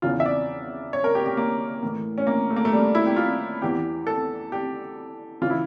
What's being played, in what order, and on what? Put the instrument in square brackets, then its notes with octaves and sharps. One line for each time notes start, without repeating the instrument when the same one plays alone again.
[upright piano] E2 C#3 E3 F4
E5
D5
C#5
A#4
G4
G4
A#3
A2 E3
C#4
A#3
A3
A#3
A3
G3
E4
G4
F4
E2 E3 G4
A4
G4
C#3 E3 F4
E4